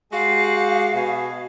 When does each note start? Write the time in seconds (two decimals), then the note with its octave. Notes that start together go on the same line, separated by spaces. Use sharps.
0.12 G#3 F#4 G4 F5
0.94 B2 G#5